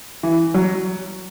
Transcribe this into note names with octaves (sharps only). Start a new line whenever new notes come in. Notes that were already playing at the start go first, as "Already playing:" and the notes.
E3
F#3